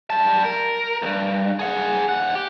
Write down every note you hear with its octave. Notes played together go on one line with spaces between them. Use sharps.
G3 A5
A#4
D2 G2
G#4 F#5
D#2 F#5
G4